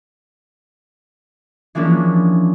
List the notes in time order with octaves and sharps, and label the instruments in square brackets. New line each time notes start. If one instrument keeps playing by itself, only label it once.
[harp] E3 F3 G#3 A#3 C#4 D4